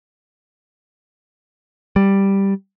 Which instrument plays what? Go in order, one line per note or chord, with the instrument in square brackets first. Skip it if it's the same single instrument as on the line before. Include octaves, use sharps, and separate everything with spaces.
[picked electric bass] G3